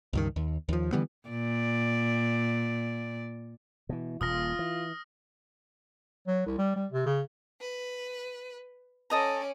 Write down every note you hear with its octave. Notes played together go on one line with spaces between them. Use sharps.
C#2 G2 D#3
D#2
D#2 F3
D3 E3 G3 B3
A#2 D5
B2 E3
D#1 A#2 F4 D#6 F6 A#6
E3
F#3
C2
G3
G3
C3
C#3
B4
C#4 A4 D5 D#5 A#5